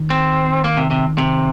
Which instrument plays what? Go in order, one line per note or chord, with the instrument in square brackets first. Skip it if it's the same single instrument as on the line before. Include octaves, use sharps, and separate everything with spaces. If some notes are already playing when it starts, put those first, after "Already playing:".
Already playing: [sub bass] D#3
[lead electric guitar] C4
A#3
C3
C3
C3